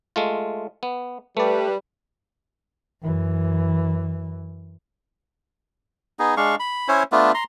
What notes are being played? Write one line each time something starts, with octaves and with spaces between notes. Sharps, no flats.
G#3 A3 F4
B3
G3 A3 B4 D5
F#2 E3
B3 D#4 G#4
G#3 D4 F5 C#6
B5
C#4 E4 C5 C#5
A3 B3 D4 F4
A#5 C6